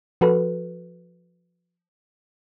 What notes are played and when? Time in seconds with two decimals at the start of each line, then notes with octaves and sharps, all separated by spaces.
0.21 F3 F#4 A4 B4